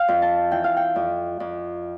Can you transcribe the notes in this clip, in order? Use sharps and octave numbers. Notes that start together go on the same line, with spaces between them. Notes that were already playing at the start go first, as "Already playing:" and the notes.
Already playing: F5 G5
F2
A5
E3 G5
F5
G5
F2
F2